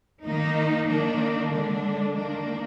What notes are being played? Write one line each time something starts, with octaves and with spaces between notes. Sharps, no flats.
D#3 A#3 D#4
D#3 A#3 D4
D3 G#3 D4
D#3 A#3 D4